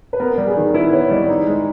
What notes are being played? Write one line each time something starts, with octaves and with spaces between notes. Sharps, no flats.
B4
B3 A#4
G3 A#4
G#4
D#3 A#4
E4 B4
B3 C#5
G3 D#5
D#4
G#3